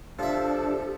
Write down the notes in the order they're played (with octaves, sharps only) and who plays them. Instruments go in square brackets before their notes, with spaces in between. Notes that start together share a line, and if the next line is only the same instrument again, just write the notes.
[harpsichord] F3 E5 [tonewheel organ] D4 A4 [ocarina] G4